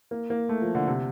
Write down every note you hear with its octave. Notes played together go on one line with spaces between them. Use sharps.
A#3
A#3
A3
F3
D3
C3